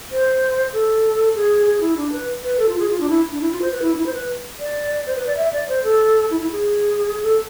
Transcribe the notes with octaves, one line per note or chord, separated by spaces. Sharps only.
C5
A4
G#4
G#4
E4
D4
B4
B4
A4
F4
G#4
F4
D4
E4
D4
E4
F4
C5
B4
E4
D4
E4
C5
B4
D5
C5
B4
D5
E5
D5
C5
A4
E4
E4
G#4
A4